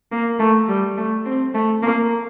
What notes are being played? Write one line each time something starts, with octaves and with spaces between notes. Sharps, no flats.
A#3
A3
G3
A3
C4
A3
A#3